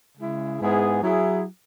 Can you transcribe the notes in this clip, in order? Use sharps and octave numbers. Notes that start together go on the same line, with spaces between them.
C#3 G#3 E4 G#4
G#2 G#3 B3 E4 G#4
F#3 E4 G#4